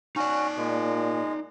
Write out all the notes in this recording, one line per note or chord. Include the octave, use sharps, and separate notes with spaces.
C#4 D#4 F#4 D5
A#2 G#3